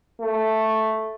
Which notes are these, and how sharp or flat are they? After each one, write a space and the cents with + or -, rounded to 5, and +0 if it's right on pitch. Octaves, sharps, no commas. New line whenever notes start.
A3 +0